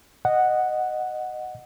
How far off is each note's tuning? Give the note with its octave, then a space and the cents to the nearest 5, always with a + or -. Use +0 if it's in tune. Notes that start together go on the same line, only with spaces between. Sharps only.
D#5 -10 F#5 +0